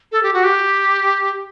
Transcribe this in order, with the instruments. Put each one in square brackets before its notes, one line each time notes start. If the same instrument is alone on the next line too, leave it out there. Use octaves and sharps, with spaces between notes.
[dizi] A4
G4
F#4
G4